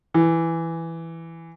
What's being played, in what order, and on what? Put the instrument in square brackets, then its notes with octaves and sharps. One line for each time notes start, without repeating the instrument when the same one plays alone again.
[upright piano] E3